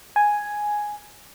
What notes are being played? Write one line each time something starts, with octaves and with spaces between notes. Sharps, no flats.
G#5